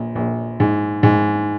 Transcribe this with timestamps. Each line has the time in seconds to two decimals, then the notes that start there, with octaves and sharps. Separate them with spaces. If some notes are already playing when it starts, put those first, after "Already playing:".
Already playing: A#1
0.15 A#1
0.60 G#2
1.03 G#2